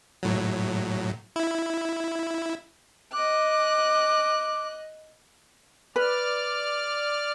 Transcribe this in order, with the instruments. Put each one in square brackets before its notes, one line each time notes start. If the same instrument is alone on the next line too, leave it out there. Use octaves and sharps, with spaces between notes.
[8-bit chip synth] A2 F#3
E4
[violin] D#5 F#6 [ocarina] D6
[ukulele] B4 [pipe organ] D5 F6